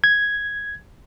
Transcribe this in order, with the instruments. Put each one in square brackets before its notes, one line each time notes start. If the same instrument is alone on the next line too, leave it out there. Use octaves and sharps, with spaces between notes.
[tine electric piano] G#6